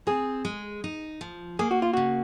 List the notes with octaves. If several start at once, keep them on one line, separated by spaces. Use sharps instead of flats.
C4 G#4
G#3
D#4
F3
A#3 G#4
F#4
F4
C#3 F#4